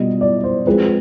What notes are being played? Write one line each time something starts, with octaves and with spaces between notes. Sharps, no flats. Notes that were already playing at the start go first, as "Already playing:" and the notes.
Already playing: B2 G3 B3 F4 D#5
D5
C5
F3 G#3 C4 F4 G#4 B4